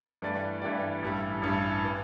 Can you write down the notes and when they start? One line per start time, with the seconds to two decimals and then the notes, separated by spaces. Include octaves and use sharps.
0.22 G2 E3 A3 G4 D5
0.62 G2 E3 A3 G4 D5
1.02 A1 G2 G3 E4
1.42 A1 G2 G3 E4
1.84 E3